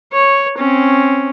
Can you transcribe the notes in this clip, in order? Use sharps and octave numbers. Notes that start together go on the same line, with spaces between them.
C#5
C4 C#4